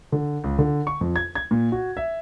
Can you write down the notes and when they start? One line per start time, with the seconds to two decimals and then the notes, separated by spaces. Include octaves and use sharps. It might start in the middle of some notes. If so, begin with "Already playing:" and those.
0.12 D3
0.44 C#2
0.59 D3
0.87 C#6
1.01 F2
1.16 G#6
1.35 G#6
1.51 A#2
1.72 F#4
1.97 E5